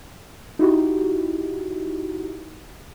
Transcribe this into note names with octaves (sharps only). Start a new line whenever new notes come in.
D#4 E4 F#4 G4